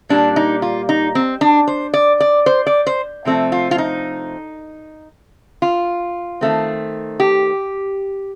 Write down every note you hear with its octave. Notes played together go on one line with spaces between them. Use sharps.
A#2 G3 A#3 D4
D#4
F4
D#4
C4
D4
C5
D5
D5
C5
D5
C5
C3 F3 A3 C4
F4
F4
D#4
F4
D#3 A3 C4
G4